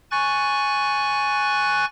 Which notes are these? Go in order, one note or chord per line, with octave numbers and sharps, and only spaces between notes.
G#5 C#6 F#6 A6